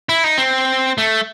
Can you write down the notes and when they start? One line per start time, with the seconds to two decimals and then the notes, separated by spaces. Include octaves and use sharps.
0.09 E4
0.24 D#4
0.38 C4
0.98 A3